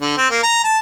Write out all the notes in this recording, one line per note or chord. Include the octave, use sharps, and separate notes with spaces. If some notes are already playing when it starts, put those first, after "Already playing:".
D3
C4
A#3
A#5
A5